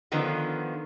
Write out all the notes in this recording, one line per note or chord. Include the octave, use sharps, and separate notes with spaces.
D3 D#3 F3 B3